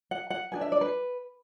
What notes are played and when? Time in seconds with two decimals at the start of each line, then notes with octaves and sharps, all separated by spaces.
0.11 F#5
0.30 F#5
0.52 D4 G#4 B4 G#5
0.61 E5
0.72 D5
0.81 B4